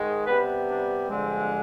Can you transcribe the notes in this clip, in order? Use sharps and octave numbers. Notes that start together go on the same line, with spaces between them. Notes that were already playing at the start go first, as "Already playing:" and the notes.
Already playing: G#2 D#3 G#3
C3 G3 B3 B4
D4
G2 D3 F3 G#3 C4